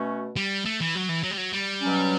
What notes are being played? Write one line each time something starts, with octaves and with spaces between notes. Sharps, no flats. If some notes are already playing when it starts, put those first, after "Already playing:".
Already playing: B2 A3 C#4 F#4
G3
A3
E3
F#3
E3
F#3
G3
F#3
G3
B2 F#3 C#4